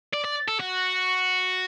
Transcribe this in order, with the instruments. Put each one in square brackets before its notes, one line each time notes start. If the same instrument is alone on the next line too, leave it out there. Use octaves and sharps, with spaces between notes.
[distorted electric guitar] D5
D5
A4
F#4